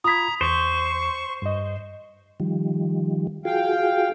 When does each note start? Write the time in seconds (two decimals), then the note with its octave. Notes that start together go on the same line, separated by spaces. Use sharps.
0.04 F4 A#5 B5 D#6 G#6 B6
0.41 E2 C5 C#6
1.42 G2 D#5
2.40 D#3 F3 G3
3.45 F4 F#4 G#4 F5 G5